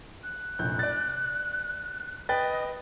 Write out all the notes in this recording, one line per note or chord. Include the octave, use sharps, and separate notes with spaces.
F#6
F1 A#1 G6
D5 A6
B4 D#5 G5 A6